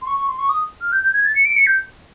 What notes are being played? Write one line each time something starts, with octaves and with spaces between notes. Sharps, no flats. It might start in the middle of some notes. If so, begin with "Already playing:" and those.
C6
C#6
C#6
C6
C#6
D#6
F6
G6
G6
G#6
A6
C#7
D7
C#7
G6